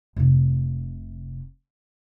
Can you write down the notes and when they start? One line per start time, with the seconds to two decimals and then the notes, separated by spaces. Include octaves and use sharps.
0.16 F1 C3